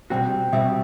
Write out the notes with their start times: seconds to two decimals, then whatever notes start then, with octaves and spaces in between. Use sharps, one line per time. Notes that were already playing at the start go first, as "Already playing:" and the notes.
0.10 B2 G3 C4 F#4 G5
0.53 B2 G3 C4 F#4 E5